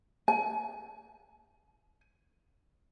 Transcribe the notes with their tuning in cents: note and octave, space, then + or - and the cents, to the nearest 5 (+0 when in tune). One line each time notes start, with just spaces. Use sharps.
G#5 +25